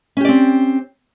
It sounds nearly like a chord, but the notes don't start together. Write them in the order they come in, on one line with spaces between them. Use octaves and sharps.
C#4 G4 D5 C4